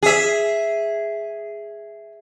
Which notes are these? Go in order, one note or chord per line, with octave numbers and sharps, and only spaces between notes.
G#4 E5